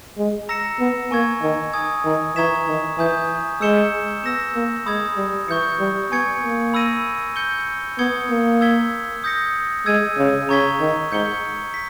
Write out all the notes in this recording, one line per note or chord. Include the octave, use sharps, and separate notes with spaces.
G#3
A#5 E6 A#6 C#7 E7
B3
A#3 G#5 C#6 G#6
D#3
G#5 D#6 G#6
D#3
E3 A#5 C#6 G#6 B6 E7
D#3
E3 G#5 D#6 G6
G#3 E6 G6 C#7 E7 G7
B3 E6 A#6 E7
A#3
G#3 B5 D#6 G#6
G3
E3 C#6 G6 C#7
G3
B3 G#5 C#6 G#6 C#7
A#3
B5 E6 A#6 D#7
G6 C#7 G7
B3 D#6 G#6 C#7 G7
A#3
E6 G#6 B6 G7
D#6 G6 A#6 C#7
G#3 E6 G#6 D#7
C#3
C#3 A#5 C#6 G#6 B6 G7
D#3
G#2 G6 C#7 G7
B6